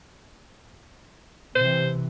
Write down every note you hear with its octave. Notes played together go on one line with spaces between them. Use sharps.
C3 E3 C5